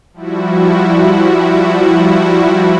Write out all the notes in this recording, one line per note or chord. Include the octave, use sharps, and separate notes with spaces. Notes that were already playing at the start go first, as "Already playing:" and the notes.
F3 G3 E4 F#4